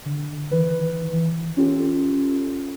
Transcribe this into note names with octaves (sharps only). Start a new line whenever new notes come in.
D3
D#3 E3 B4
E3
C#4 F4 G4 A4